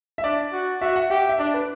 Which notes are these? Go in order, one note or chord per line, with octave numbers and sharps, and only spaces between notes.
E5
D4 D5
F#4
F#4 E5
F#5
G4 E5
E5
D4 D5
B4